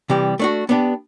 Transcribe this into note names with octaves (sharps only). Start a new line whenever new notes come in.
C3 E3 G3
A3 D4 F#4
B3 D4 G4